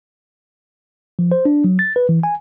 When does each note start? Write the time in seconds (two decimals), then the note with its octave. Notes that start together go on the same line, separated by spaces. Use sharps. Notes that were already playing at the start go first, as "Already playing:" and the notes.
1.19 F3
1.32 C5
1.45 D4
1.64 F#3
1.79 A6
1.96 B4
2.09 E3
2.23 G#5